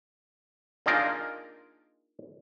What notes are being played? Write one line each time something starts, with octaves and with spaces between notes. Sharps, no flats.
A#3 D4 D#4 F4 G#4 A#4